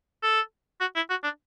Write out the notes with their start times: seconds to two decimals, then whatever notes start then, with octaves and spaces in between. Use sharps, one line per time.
0.23 A4
0.80 F#4
0.95 E4
1.10 F#4
1.24 D4